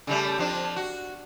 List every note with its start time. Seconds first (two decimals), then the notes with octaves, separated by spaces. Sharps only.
0.07 C#3 G3 A3
0.38 F2 F3 D4
0.76 F#4